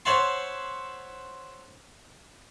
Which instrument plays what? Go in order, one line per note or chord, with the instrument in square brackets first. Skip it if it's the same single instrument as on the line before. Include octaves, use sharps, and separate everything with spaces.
[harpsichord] C5 C#5 E5 F#5 A5 C6